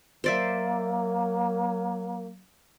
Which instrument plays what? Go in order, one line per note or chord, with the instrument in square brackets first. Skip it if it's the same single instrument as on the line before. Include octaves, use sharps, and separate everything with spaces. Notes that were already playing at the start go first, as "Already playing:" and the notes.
[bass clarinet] F#3 [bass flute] A#3 [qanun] C5 D5 E5